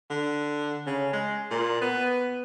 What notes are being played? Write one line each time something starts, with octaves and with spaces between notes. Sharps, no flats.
D3
C#3
G#3
A#2
B3